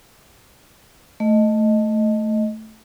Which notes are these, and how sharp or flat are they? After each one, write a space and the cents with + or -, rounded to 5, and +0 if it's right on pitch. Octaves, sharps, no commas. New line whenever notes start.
A3 +0 D#5 +0